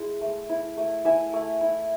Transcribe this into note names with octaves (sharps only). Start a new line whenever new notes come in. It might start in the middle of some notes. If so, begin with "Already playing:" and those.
Already playing: G#3 E4
A3
E4
A3
E4 E5 G#5
A3
E4